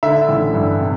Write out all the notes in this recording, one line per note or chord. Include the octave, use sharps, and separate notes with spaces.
D3 E5
A1
G2
C3